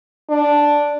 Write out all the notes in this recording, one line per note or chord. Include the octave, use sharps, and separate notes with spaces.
D4